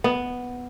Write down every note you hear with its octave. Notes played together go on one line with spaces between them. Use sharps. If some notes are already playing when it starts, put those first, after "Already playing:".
B3